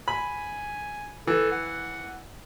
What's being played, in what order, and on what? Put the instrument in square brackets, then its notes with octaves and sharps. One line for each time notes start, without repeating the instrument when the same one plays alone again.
[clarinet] G#5 [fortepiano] B5
[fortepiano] E3 [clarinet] A4
[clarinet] F#5